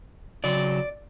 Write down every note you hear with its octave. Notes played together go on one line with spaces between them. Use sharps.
C#3 F#3 D5